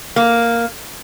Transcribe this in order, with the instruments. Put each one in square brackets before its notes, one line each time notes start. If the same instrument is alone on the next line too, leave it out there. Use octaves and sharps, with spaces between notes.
[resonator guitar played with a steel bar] A#3